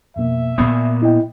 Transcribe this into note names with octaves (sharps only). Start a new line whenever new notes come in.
F2 B2 A#3 E5
A#2 B3 D#6
E4 D#5 G5